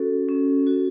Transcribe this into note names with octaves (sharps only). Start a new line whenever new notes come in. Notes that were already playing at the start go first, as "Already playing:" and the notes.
Already playing: C#4 F#4 A4
C#4
F#4